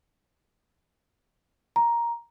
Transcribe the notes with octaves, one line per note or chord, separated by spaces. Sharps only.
A#5